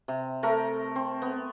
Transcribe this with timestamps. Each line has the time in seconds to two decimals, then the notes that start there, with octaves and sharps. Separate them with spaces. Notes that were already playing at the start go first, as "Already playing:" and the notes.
0.08 C3
0.43 A3 A#4
0.96 C4
1.22 B3